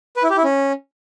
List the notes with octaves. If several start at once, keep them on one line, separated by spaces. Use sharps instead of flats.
B4
E4
G4
E4
C#4